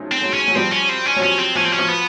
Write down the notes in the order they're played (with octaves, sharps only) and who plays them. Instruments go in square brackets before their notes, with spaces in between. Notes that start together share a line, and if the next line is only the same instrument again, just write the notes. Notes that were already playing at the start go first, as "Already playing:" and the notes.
Already playing: [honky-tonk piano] F3 F#3 G#3 A3 C#4 D#4
[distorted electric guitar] C4
[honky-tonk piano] F#3 G#3
[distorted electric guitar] C#4
[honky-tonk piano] F#3
[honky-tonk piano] F3 G3 [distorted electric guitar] C4
[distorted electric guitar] C#4
C4
C#4
[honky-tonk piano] F#3
[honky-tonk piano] F3 [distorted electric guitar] C#4
[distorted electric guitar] C4
[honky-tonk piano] F3 [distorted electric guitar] C#4
[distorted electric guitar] C4
C#4
[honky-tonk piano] F3
[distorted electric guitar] B3